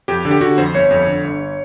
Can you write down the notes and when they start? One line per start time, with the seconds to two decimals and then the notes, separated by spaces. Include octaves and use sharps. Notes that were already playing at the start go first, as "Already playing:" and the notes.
0.08 F2 G4
0.25 D3
0.31 G4
0.41 D3 F#4
0.58 F2 C5
0.74 G1 C#5
0.91 F2
1.07 D3
1.24 G1